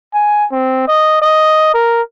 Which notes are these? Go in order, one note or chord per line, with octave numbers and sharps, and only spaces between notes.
G#5
C4
D#5
D#5
A#4